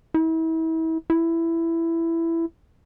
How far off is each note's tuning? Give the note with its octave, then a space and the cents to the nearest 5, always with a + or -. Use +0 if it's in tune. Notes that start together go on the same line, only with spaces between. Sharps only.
E4 -35
E4 +10